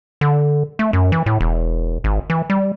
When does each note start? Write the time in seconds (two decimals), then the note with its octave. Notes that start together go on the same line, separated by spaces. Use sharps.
0.21 D3
0.79 A3
0.93 F#2
1.12 E3
1.26 A2
1.41 E1
2.04 G#1
2.30 E3
2.50 G3